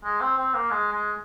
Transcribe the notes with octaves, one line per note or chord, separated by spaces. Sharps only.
G#3
C4
C4
A#3
G#3
G#3